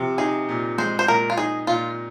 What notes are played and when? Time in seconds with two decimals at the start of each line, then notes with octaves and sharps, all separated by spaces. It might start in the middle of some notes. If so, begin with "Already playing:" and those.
Already playing: C3 F3
0.18 D#4 G#4
0.49 A#2
0.78 G#3 C5
0.99 C5
1.08 A#2 A#4
1.30 F4
1.38 D#4 G#4
1.67 A#2 F4